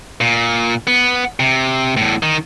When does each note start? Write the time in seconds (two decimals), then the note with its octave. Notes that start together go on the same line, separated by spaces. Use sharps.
0.21 A#2
0.87 B3
1.40 C3
1.97 E2 A2
2.23 D#3